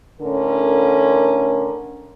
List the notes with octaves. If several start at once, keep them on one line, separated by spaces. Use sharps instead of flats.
A2 D3 C#4 A#4